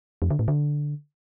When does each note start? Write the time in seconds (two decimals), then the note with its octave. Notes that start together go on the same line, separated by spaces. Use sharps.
0.22 F2
0.30 D3
0.39 A2
0.48 D3